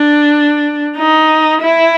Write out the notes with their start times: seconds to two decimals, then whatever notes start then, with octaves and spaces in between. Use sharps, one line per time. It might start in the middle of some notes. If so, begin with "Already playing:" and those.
Already playing: D4
0.97 D#4
1.61 E4